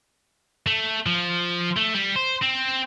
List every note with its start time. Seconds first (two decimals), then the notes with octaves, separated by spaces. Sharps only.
0.67 A3
1.06 F3
1.76 A3
1.93 G3
2.15 C5
2.42 C4